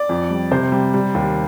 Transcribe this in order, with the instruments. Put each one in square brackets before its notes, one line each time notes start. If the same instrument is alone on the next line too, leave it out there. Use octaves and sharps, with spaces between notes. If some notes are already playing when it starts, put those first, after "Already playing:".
Already playing: [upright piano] D5
F2
G3
C3 C5
G3
G3
D#2